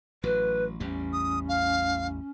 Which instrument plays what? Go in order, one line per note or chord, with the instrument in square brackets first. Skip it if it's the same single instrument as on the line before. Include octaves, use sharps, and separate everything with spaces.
[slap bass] A1 F#3 [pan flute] B4
[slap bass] A1 E2 G3 [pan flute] C#4
[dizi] D#6
F5